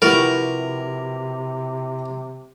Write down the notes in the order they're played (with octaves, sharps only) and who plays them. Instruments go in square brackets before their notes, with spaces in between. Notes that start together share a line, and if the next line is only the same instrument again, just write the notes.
[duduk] C3 [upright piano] F3 E4 G4 [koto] F#4 B4 D5 [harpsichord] A#4